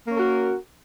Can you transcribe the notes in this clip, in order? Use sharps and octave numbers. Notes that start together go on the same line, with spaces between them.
A#3 C#4 F#4 A#4